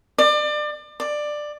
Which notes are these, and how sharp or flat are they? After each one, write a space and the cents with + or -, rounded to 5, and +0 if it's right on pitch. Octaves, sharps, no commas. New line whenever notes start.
D5 +30
D5 +15